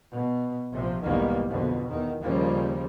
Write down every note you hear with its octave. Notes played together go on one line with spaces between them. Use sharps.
B2
A#1 C3 F3
B1 E2 G#2 D#3 G3 A#3
F2 B2 D3
E2 D#3
D#2 C#3 F3 G3 A#3